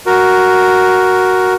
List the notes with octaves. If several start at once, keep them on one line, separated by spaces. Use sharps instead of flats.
F#4 A#4